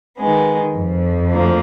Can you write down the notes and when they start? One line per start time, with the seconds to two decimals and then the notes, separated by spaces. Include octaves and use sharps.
0.19 D#3 G#3 B3
0.75 F2
1.31 D2 D3 F3 A#3